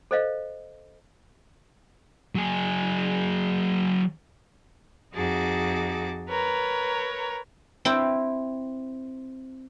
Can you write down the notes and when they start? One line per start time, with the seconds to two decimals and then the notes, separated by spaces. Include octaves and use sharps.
0.11 A4 C5 D#5 F5
2.35 F#3 G#4
5.13 F2 D#4 F#4 G#4 A5 D6
6.29 A#4 B4 C#5 A#5
7.85 C4 E4 G5